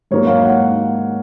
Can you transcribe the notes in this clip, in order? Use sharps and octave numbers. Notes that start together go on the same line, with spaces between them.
G#2 F#3 A#3 C#5
F5
F#5